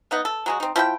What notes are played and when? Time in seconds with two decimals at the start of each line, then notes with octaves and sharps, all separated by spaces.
0.11 B3 D#4 F#5
0.25 A4
0.46 F#3 G#3 F#4
0.60 C4 D#4
0.76 F3 E4 A4 G5